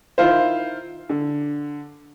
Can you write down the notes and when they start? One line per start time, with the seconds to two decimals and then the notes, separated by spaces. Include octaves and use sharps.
0.18 D#3 E4 F4 C5
1.09 D3